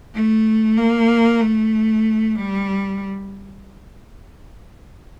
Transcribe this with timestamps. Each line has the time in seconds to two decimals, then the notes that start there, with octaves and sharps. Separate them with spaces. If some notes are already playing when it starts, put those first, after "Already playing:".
0.15 A3
0.78 A#3
1.41 A3
2.36 G3